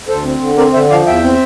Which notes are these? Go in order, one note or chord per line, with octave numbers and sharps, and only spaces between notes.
D2 A4 C5
C4
D3
C4 A#4 D5
D3 C5 E5
F3 D5 F5
E2 E5 G5
C4